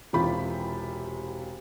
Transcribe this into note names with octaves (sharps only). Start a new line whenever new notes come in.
E1 C3 E3 F4 G4 B5